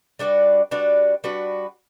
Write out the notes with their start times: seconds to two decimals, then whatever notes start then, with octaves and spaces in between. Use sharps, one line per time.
0.19 G3 D4 F#4 B4
0.71 G3 D4 F#4 B4
1.24 G3 D4 F#4 B4